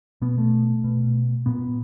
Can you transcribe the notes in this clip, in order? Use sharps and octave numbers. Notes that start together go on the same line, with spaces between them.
B2 B3
A3
B2
A#2 B3